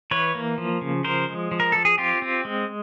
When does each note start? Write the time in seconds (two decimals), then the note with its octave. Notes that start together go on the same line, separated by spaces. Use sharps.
0.11 E3 B4 C#5
0.35 A#3
0.58 F3
0.81 C#3
1.04 F3 A#4 C5
1.29 G#3
1.51 F3
1.60 A#4
1.72 F3 A4
1.85 G#4
1.98 C4 F4 G4
2.22 C4
2.45 G#3